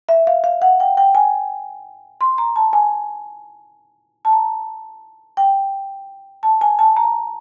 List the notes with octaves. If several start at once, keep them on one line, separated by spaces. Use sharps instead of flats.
E5
F5
F5
F#5
G5
G5
G#5
C6
A#5
A5
G#5
A5
A#5
G5
A5
G#5
A5
A#5